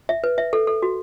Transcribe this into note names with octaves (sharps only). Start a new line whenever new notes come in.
E5
B4
E5
A4
A4
F#4